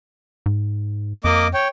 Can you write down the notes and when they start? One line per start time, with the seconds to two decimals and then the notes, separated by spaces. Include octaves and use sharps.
0.46 G#2
1.24 F2 A#3 D#5 D6
1.54 C#5 G5